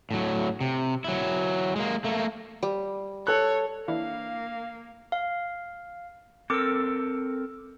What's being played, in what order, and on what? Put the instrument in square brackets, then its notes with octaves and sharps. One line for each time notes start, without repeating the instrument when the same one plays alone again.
[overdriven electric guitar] A2 F#3
C3
F#3 E4
G#3 A#3
A3 A#3
[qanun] G3
[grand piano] A4 F#6 [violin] C#5
[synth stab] E3 D4 E4 [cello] A#3 [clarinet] F5
[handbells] F5
[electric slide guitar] C4 A4 A#4 [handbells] D6 E6